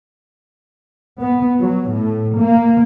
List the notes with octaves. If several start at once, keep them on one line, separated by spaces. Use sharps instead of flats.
B3
F#3
A2
A#3